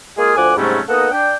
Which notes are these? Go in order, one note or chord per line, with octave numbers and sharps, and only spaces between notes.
G#3 A#3 F4 G#4
D2 F3 F#5 G#5 D6
G#2 C3 F#3 G3 A3 C#4
A#3 B3 D#4 A4 D#5 F#5
D4 G5